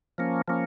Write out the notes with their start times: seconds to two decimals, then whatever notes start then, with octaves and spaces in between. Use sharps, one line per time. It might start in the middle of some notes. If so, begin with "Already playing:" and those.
0.18 F3 A#3 C#4
0.48 F3 A#3 C#4